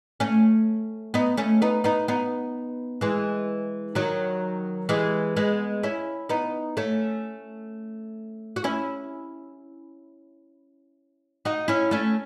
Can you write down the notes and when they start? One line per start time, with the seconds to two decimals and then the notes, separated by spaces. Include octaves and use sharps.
0.20 A3 C#4
1.14 B3 D#4
1.37 A3 C#4
1.62 B3 D#4
1.84 B3 D#4
2.08 B3 D#4
3.01 E3 G#3
3.95 D#3 F#3
4.89 E3 G#3
5.36 G#3 B3
5.83 C#4 E4
6.29 B3 D#4
6.77 A3 C#4
8.56 F#4
8.64 C#4 E4
11.45 D#4 F#4
11.68 C#4 E4
11.91 A3 C#4